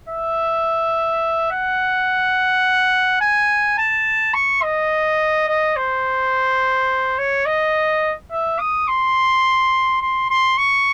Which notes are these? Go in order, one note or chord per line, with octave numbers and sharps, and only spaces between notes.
E5
F#5
G#5
A5
C#6
D#5
D#5
C5
C#5
D#5
E5
D#6
C6
C6
C6
C#6